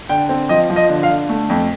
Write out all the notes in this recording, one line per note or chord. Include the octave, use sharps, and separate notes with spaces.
D3 G5
C4
F3 D#5
F3
D#5
D3
F5
D3
A3
F2